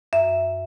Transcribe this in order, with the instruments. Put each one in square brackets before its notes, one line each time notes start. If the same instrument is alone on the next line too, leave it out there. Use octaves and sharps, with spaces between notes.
[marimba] F#2 E5